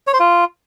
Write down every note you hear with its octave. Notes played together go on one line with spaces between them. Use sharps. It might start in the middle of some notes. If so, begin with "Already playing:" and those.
C#5
C5
F4